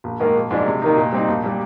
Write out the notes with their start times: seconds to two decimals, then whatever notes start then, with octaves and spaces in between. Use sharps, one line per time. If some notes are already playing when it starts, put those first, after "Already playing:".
0.04 A#1
0.20 G#2 D#3 A#3
0.35 A#1
0.51 G#2 F3 G#3 D4
0.66 C3
0.82 D#3 A#3 D#4
0.97 A#2
1.12 G3 C4 D#4
1.28 A#1
1.43 A#2 G3